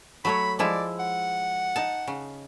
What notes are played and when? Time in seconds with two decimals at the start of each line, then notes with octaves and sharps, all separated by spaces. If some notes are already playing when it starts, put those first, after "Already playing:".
0.25 F#3 A3 C#5 B5
0.59 F3 G#3 E4 D5
0.99 F#5
1.76 D#4 A5
2.07 C#3